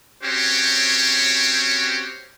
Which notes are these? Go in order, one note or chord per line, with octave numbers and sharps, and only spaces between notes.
C4 C#4 F#4 G4 C5 C#5